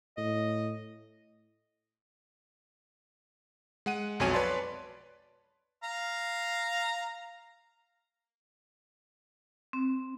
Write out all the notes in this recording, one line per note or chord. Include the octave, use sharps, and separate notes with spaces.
A2 D#5
G#3 F#5 D#7
B1 F2 F#4 C#5 G#5 D#7
B4 C#5 D5 A5 C6
F5 A#5
C4